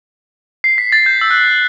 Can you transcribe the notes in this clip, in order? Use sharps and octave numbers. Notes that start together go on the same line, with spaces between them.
C7
B6
A6
G6
E6
F#6